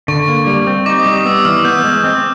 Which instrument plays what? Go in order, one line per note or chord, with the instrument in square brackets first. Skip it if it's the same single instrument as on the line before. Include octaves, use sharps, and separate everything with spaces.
[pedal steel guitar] D3 [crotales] C#6
[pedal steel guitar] A#3
G3
C4
[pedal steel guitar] D#4 [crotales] D6
[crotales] D#6
[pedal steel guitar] G3
[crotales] D#6
[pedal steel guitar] B3 [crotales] E6
[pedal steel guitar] E3 [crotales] F6
[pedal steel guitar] B3 [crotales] G6
[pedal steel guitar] G#3
C4